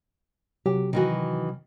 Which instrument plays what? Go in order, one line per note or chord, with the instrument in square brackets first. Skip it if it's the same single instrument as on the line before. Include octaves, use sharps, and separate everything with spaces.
[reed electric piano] C3 F#3 [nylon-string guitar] G4
[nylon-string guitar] D#3 E3 F#4